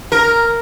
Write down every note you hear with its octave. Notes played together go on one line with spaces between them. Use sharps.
A#4